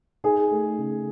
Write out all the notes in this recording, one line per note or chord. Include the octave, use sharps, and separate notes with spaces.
D#4 G#4
A3
C#3